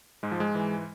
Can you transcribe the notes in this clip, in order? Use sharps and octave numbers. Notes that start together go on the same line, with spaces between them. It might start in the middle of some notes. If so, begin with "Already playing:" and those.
G#2 G#3
F3
G#3
E3